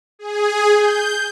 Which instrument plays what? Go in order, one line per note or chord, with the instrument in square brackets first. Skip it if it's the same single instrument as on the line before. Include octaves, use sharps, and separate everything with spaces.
[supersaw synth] G#4
G6